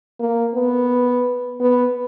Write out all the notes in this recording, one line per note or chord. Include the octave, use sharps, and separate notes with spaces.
A#3
B3
B3